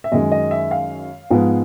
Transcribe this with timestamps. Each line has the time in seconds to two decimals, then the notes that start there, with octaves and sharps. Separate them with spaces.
0.04 E5
0.12 F#2 D#3 G#3 C#4 D#5
0.32 D#5
0.51 E5
0.71 F5
1.30 G#2 F3 G#3 B3